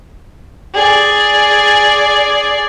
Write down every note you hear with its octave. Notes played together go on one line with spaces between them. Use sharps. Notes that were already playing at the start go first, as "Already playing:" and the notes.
G#4 D5